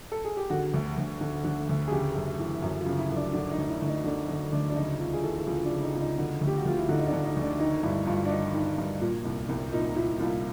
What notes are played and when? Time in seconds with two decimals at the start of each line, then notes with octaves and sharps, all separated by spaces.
0.12 A4
0.25 G#4
0.37 G4
0.50 D3 F#4
0.74 D2
0.98 D2
1.21 D3
1.44 D3
1.69 D2
1.88 G#4
1.92 C#3 G4
2.15 F#2
2.39 E3
2.62 F#2
2.80 F4
2.86 C#3
2.99 E4
3.10 F#2
3.16 D4
3.33 D3 D4
3.51 D#4
3.58 D2
3.69 E4
3.82 D2
3.87 D#4
4.04 D3 D4
4.28 D3 D#4
4.52 D2 D4
4.70 D4
4.76 C#3 D#4
4.99 C#2
5.14 G#4
5.24 E3 A4
5.38 A4
5.47 C#2 G#4
5.65 D4
5.71 C#3
5.83 D#4
5.95 C#2
6.00 D#4
6.18 D3
6.41 D2
6.47 G4
6.57 F#4
6.65 D2 F4
6.78 E4
6.89 D3 D#4
6.99 D#4
7.07 D4
7.13 D3
7.24 D#4
7.36 D2
7.42 D4
7.59 D#3 D#4
7.83 G2 E4
8.06 G2 F4
8.25 D4
8.31 D#3 D#4
8.54 D#3
8.78 G2
9.01 A#2
9.25 C2
9.49 C2
9.72 A#2 D#4
9.96 A#2 E4
10.19 C2 F4